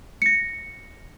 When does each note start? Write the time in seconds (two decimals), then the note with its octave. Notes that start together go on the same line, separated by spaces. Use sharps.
0.22 A#6 C#7